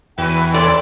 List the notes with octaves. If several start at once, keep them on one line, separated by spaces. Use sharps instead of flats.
E2 F#4 B4 G5
C4 E4 A4 D5 C6